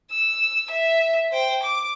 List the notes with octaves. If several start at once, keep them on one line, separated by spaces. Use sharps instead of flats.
E6
E5
C5 G5
D6